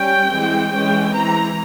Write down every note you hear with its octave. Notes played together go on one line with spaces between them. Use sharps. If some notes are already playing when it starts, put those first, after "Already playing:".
Already playing: G3 C#4 G5
E3 G#3 C4
E3 G#3 C#4 G5
E3 G#3 C4 A#5